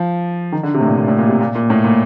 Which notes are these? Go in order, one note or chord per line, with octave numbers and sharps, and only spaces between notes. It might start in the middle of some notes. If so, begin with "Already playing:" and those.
Already playing: F3
D#3
D3
C3
A2
A#2
A#2
A2
A#2
C3
A#2
A#2
A2
A#2